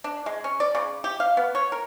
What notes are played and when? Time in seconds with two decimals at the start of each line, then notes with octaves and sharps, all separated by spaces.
0.04 D4
0.26 G#3
0.44 C#4
0.60 D5
0.75 C#3
1.04 G4
1.20 F5
1.37 B3
1.55 C#5
1.72 A#4